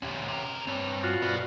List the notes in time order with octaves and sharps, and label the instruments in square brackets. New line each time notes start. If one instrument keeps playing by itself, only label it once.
[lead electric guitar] D2 C3 [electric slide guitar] C#4 G4
[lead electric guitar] C3 A#4
[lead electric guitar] G2 [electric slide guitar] C4 C#5
[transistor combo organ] F4 F#4
[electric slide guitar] B2 C5 D5 [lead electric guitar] B3